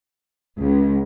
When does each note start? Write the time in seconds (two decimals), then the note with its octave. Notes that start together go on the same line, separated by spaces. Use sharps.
0.59 C#2